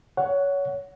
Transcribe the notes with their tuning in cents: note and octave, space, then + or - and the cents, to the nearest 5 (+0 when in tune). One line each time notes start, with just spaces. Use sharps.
C#5 +20 F#5 +0